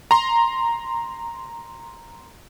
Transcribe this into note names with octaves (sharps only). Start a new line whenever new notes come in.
A#5 C6